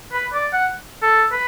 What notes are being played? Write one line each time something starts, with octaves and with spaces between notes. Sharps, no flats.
B4
D5
F#5
A4
B4